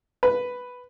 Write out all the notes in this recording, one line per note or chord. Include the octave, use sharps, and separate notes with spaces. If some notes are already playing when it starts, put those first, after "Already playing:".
B4